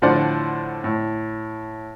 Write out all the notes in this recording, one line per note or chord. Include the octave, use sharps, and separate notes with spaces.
A2 D3 F3 C5 D5 F#5
A2